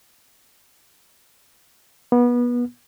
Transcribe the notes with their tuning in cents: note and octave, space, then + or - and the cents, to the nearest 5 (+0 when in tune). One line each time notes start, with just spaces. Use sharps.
B3 -25